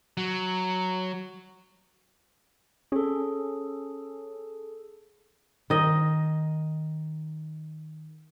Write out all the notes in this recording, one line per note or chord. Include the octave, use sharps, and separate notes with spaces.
F#3
C#4 G#4 A4
D#3 D#5